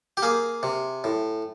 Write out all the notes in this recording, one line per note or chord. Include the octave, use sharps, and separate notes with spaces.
G4
A#3 G#4
C3
A2